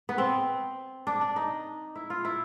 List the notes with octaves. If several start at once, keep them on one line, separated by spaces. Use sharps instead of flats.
B3
C4
D4
D4
D#4
E4
F4
E4